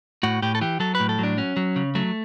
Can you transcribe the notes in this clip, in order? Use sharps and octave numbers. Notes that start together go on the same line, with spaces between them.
A2 F#4
A2 G4
A4
E3 G4
F#3 A4
B4
A2
A4
F#3 D4
F#3 C#4
F#3
C#3
F#3 A3